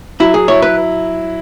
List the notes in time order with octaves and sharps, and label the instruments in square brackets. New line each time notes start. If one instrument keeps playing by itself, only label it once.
[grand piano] F#3 [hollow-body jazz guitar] E4
[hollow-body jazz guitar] G#4
[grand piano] E4 [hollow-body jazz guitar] C#5
[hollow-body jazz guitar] B4